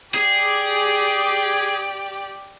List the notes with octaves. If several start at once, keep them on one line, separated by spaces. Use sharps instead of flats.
G4 G#4 D5